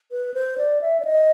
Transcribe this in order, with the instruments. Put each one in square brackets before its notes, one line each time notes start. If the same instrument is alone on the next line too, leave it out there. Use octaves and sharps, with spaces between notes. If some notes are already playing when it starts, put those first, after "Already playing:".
[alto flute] B4
C5
D5
E5
D5
D#5